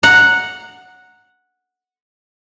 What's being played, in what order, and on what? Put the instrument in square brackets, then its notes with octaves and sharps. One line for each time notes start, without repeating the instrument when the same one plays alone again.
[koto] F#5 A#5